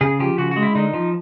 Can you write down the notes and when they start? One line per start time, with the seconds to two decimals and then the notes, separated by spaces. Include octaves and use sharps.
0.01 C#3 G#4
0.20 F3 G4
0.38 C#3 F#4
0.51 G#3 F#4
0.63 E4
0.75 D3 D#4
0.93 F3